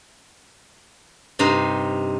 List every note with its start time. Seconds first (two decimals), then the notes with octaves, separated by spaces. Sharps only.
1.39 G2 C3 D#4 C5 A#5